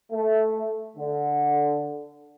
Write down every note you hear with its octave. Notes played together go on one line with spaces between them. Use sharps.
A3
D3